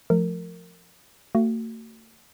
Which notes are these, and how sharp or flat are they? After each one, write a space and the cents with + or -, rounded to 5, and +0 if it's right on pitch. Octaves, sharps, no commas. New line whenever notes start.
F3 +0 A3 -20 A#4 -20
A3 +45 F#4 +20